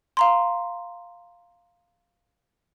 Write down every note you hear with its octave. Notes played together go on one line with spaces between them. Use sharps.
F5 A#5 C6